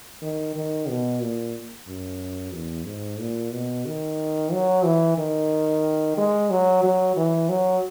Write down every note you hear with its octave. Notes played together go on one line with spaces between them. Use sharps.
D#3
D#3
B2
A#2
F#2
E2
G#2
A#2
B2
D#3
F#3
E3
D#3
G#3
F#3
F#3
E3
F#3